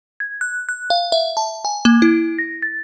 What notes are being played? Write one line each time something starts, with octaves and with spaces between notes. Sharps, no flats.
G#6
F#6
F#6
F5
E5
A5
G#5
A#3
E4
A#6
A6